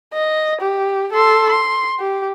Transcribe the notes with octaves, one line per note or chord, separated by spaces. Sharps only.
D#5
G4
A4 C6
C6
G4